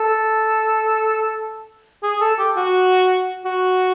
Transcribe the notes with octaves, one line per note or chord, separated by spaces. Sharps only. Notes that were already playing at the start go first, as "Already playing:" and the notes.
Already playing: A4
G#4
A4
G4
F#4
F#4